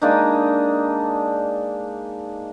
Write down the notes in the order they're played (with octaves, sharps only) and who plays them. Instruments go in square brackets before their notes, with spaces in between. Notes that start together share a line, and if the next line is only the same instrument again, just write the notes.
[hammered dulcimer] G#3 A#3 D4 D#4